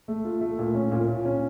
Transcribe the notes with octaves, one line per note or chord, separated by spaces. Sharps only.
A3
F4
A3
A#2
C#4
A#2
A#2
C#4